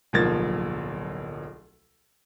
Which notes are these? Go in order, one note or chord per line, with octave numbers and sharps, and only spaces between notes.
D1 B1 F3 A#3 G#6 A6